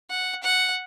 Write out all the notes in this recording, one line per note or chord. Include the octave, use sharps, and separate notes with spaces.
F#5
F#5